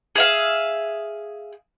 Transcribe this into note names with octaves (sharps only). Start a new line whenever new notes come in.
G#4 E5 F5